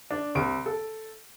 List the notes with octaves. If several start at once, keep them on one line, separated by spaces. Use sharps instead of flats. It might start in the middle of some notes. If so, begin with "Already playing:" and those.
D4
C2 D7
A4